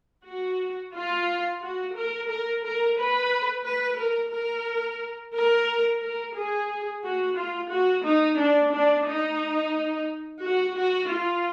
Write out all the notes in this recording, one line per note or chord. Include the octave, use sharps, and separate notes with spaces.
F#4
F4
F#4
A#4
A#4
A#4
B4
B4
A#4
A#4
A#4
A#4
G#4
F#4
F4
F#4
D#4
D4
D4
D#4
F#4
F#4
F4